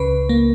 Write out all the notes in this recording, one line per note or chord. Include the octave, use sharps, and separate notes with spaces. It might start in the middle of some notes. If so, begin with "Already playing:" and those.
Already playing: C#2 C#3 B4
A#3